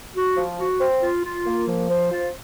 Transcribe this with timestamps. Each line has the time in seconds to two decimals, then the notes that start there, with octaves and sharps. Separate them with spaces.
0.15 F#4
0.37 F3
0.58 F#4
0.80 C4
1.02 F4
1.24 F4
1.46 A#3
1.67 F3
1.89 C5
2.11 F4